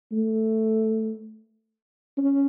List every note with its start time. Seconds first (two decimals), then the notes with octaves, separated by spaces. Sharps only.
0.12 A3
2.18 C#4